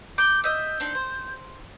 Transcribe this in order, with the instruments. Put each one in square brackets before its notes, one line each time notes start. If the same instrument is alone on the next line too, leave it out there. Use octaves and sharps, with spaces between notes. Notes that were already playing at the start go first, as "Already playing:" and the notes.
[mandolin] D6 [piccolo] G6
[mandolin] D#5 E5 [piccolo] G6
[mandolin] C4 D4 D#4
C5